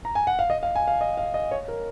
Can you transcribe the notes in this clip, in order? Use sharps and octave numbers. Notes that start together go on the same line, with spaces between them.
A#5
G#5
F#5
F5
D#5
F5
G#5
F5
D#5
F5
D#5
C#5
A#4